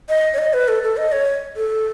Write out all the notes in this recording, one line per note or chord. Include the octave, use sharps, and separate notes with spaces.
D#5
C#5
D#5
B4
A4
A4
D#5
C#5
A4